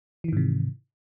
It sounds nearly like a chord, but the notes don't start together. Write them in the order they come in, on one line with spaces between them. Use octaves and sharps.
E3 D#3 G#2 C3